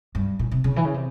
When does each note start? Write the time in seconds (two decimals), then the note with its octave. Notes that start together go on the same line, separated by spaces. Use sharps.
0.15 G2
0.39 A#2
0.51 C3
0.64 C#3
0.76 E3
0.85 C#3
0.94 C3